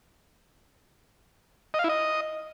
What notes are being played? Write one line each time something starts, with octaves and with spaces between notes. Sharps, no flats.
D#5
F5
E4
D#5